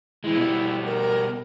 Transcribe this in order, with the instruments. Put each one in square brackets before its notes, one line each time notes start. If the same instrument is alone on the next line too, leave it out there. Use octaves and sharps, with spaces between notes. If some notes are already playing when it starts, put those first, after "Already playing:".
[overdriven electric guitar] E3 G#3 [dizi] E4
[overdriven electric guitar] B2 G3
[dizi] A#4